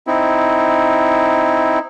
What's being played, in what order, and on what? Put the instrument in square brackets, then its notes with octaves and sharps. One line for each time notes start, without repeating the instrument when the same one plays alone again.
[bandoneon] C4 D#4 E4